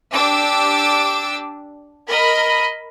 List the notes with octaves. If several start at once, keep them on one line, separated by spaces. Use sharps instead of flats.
D4 G4 D6 E6
A#4 D#5 B5